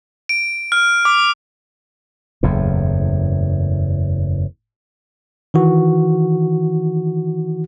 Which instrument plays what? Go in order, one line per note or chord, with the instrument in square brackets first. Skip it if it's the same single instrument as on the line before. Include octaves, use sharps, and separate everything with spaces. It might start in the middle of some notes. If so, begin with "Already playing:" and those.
[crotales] D7
F6
D6
[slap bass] F#1 E2 A2
[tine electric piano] D#3 E3 F#4